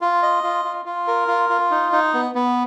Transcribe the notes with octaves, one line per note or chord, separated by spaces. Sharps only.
F4
D#5
F4
F4
F4
A#4
F4
F4
D#4
D#4
B3
B3